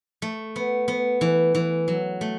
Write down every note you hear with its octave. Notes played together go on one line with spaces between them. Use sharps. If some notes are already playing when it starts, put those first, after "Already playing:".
A3
B3
B3
E3
E3
F#3
A3